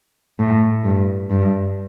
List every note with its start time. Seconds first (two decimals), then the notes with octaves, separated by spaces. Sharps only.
0.39 A2
0.84 G2
1.30 G2